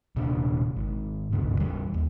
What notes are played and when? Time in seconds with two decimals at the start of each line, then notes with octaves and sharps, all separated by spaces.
0.16 D#1 C3 D4
0.76 G#1
1.33 G1 D2 C3
1.60 E2 G3
1.94 D#2